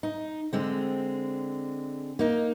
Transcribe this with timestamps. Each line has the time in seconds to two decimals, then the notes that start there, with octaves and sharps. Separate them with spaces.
0.03 D#4
0.53 D3 G#3 C4
2.19 A#3 D#4